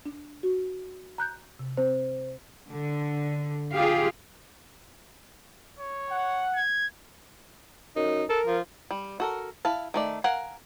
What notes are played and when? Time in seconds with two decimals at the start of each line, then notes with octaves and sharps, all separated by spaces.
0.06 D4
0.43 F#4
1.18 A#5 F#6 G6
1.59 C3
1.77 C4 C5
2.70 D3
3.72 F4 G4 G#4 F5
5.79 C#5
6.11 F#5
6.56 G#6
7.96 F#2 D#4
8.29 A4 A#4
8.46 F3
8.91 G3
9.20 F#4 A4 A#4
9.65 E4 F5 A5
9.94 D#3 A3 D5
10.24 A#4 F5 F#5 G#5